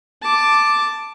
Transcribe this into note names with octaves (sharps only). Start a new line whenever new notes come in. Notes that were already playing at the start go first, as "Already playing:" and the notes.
A5 D6